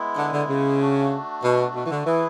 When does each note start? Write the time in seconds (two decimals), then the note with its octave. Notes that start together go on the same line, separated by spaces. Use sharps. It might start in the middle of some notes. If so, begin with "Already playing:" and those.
Already playing: G#3 B3 E4
0.17 D3
0.33 D3
0.49 C#3
0.80 A3 D4 F#4
1.43 B2
1.75 B2
1.86 E3
1.91 D3
2.06 E3 E4 G#4 B4